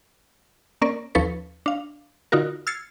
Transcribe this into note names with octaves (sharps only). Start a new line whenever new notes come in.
A#3 C#4 A#4 D5
D#2 F3 C#4 A4 B4 C#7
D4 F5
D3 D#4 F4 F#4 A#4
E6 F6 G#6 A6 C7 C#7